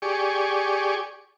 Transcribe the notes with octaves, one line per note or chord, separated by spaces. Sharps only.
G4 G#4 D5 C#6